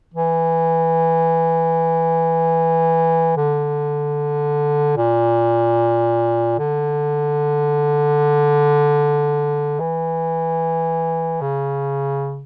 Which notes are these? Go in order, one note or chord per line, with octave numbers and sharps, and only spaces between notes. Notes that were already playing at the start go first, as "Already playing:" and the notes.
E3
D3
A#2
D3
E3
C#3